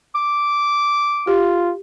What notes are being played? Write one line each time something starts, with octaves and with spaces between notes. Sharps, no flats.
D6
F4 G4